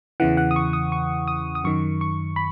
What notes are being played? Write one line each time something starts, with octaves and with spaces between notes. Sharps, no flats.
E2 C#3 E3 F#5
F#5
D#6
C#6
D#6
C#6
D#6
D#6
F#2 D#3 C#6
C#6
B5